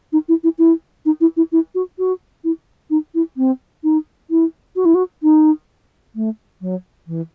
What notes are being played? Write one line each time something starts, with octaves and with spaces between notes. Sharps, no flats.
D#4
E4
E4
E4
D#4
E4
E4
E4
F#4
F#4
E4
D#4
E4
C4
D#4
E4
F#4
E4
F#4
D#4
A3
F#3
E3